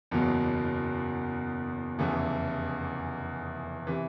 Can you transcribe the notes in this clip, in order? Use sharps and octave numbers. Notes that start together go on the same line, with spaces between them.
F#1 E2 B2 F#3
F1 E2 C#3 E3 A3
C3 E3